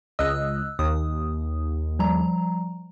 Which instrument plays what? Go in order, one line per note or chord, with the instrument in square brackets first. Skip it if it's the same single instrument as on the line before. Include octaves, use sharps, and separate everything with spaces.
[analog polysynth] C#2 D#5 [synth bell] E6 F#6
[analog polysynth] D#2 [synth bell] D#6
[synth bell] F3 G3 A#5